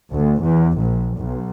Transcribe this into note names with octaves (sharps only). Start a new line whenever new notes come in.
D2
E2
A#1
B1